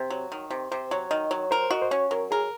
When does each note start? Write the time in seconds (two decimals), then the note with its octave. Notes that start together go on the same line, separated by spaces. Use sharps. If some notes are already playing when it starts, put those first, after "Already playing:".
Already playing: C3
0.10 F#3
0.32 D#3
0.51 C3
0.72 C3 C5
0.91 F#3 C#5
1.11 D#3 D#5
1.31 F#3 C#5
1.51 A#4 C5
1.71 F#4 D#5
1.82 C5
1.91 C#4 C#5
2.11 F#3 A#4
2.31 G#4 A#4